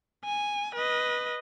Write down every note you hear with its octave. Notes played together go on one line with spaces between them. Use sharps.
G#5
B4 D#5